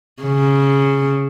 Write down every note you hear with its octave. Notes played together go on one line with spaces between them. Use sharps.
C#3